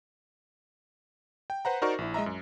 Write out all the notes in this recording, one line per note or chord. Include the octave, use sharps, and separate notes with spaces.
G5
B4 C5 F#5 A#5
D#4 F#4 A#4 C5 D5 C#6
A#1 E4
G#3 D#5 E5 A#5
F#2